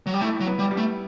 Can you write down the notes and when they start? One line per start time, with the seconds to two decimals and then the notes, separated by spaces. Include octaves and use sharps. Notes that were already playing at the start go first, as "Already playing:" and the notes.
0.06 F#3
0.14 G3
0.21 A3 E4
0.40 F#3
0.47 B3
0.59 G3
0.71 G3
0.77 A3